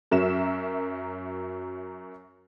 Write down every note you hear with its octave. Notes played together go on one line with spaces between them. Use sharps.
F#2 F#3 A#4 E5 E7